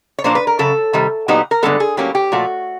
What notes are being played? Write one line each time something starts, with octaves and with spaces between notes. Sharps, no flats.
C#5
A#2 F3 A#3 D4 C5
B4
A#4
F#2 C#3 A4
C3 D#3 G3
A#2 F#3 B3 D#4 G4
A#4
G2 D3 F3 G#3 B3 A4
G#4
A2 F#3 A#3 C#4 G4
G4
A#2 F3 A3 F#4